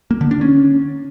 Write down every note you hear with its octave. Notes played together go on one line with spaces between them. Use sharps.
A#3
D3
D4
C#4